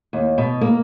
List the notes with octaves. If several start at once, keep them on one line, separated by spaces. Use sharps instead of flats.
D#2
B2
A#3